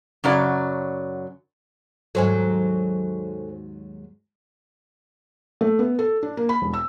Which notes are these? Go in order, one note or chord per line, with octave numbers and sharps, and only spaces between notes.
F#2 C#3 F#3 D5
D#2 G#2 F#3 A4 C5 G#5
A3
B3
A4
D4
A#3
B5
E1
E6